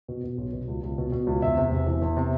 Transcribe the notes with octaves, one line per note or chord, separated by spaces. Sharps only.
B2
B2
B1
B2
C#2
C#2
B2
B2
C#2
E2 E5
C3
E1
E3
E2
C3